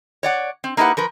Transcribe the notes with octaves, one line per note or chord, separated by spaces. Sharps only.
C#5 D5 F#5
C4
A#3 D#4 E4 G4 B4 F#5
F3 A#4 B4